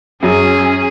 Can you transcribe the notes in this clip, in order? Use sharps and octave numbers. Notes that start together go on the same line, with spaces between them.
F#2 F#3 C#4 G#4